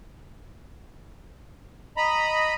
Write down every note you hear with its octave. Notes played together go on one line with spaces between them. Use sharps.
D#5 A#5 B5